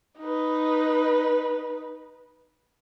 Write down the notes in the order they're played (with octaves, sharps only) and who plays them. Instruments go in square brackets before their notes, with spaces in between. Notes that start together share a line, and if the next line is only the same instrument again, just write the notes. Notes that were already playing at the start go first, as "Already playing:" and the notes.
[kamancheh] D#4 B4